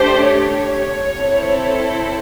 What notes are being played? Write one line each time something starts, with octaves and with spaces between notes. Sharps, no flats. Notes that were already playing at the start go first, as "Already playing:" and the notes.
Already playing: A3 D4 G4 C5
C#5
C4 E4 A4